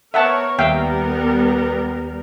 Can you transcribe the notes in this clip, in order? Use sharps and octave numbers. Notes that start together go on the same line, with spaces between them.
B3 A#4 C#5 E5 F#5 A5
D#2 G3 B3 A#4 E5 F5 G5